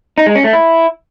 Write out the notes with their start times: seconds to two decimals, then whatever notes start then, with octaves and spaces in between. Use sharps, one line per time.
0.18 D#4
0.26 G#3
0.35 C#4
0.44 A3
0.53 E4